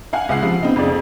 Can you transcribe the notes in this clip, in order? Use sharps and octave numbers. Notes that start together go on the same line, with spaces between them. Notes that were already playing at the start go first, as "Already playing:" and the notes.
F5 F#5 G#5
C#2 F4 F#5 C7
C3 F3
B3 C4 D#4
F2 C#3 D5